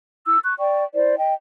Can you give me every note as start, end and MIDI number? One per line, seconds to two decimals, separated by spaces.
0.24 0.38 64
0.24 0.38 88
0.43 0.54 85
0.43 0.54 90
0.59 0.83 74
0.59 0.83 79
0.59 0.83 85
0.94 1.16 64
0.94 1.16 72
0.94 1.16 74
1.18 1.34 75
1.18 1.34 79